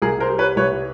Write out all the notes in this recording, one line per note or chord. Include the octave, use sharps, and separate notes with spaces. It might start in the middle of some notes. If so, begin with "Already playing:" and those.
C2 G#4 A#4
A#4 C5
G3
B4 C#5
C2 B4 C#5